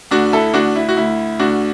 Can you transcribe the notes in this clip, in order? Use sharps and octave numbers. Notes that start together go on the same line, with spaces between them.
D2 D4 F#4
E4 A4
D2 D4 F#4
E4
F#4
D2 E4
D2 D4 F#4